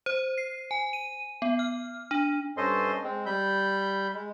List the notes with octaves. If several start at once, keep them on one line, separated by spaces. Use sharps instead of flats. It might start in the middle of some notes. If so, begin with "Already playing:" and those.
C5
C7
G#5
D#7
B3
F6
D4
G2 C#4 A4 C5 D#5 C6
G#3 C4
G3 B5 G6
G#3